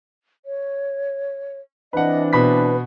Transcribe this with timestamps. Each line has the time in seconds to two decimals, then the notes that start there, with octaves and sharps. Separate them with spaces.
0.45 C#5
1.93 E3 C4 D4 B4 D#5 F#5
2.33 B2 B4 B5 B6